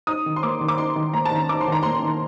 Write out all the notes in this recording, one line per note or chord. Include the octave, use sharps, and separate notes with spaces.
D#4 D#6
D#3
C6
A#3 D6
D#3
D6
D#4 C6
D#3
A#3 A#5
A5
D#3 A#5
D#4 D6
C6
D#3 A#5
A#3 C6
D#3